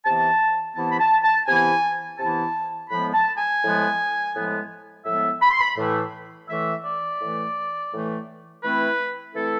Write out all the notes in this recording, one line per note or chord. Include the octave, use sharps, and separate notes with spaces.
C3 E3 B3 E4 A5
C3 E3 B3 E4 A5
B5
A5
A5
C3 E3 B3 E4 G#5
C3 E3 B3 E4 A5
A2 F3 G#3 B3 B5
A5
G#5
A2 F3 G#3 B3
A2 F3 G#3 B3
A2 F3 G#3 B3 E5
B5
C6
B5
A2 E3 A3
A2 E3 A3 E5
D5
A2 E3 A3
A2 E3 A3
E3 A3 C4 E4 B4
E3 A3 C4 E4 A4